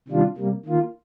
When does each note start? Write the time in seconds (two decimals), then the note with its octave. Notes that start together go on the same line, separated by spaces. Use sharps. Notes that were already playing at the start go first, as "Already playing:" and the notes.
0.08 C3 D#3 G3 D4 F4
0.37 C3 G3 A#3
0.65 D#3 A#3 F4